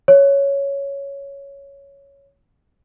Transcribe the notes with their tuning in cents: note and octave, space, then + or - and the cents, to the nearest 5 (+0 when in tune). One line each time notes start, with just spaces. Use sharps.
C#5 +5